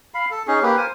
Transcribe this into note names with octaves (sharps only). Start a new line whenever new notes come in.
F5 B5
A4
C#4 D#4 G#4
A#3 G4 B4
A#4 C5 G#5